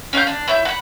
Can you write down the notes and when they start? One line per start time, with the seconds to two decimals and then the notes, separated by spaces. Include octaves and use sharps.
0.13 C#4 E5 F5 G6
0.27 D4
0.48 E4 C#5 E5 G6
0.65 F#5 B5